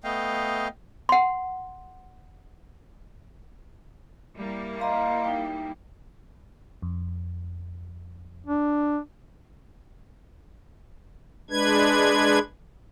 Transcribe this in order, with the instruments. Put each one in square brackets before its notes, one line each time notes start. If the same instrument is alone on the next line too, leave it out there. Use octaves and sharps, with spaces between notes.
[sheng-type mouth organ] A3 B3 D#5 F5 G5
[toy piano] F#5 C6
[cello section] G3 A#3 E4
[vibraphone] D#5 A#5 C6 [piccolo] F5
[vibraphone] D#4 G5
[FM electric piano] F2
[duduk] D4
[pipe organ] G#3 D4 B4 G#6